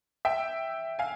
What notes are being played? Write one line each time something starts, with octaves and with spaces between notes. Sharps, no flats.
E5 G5
F5 G#5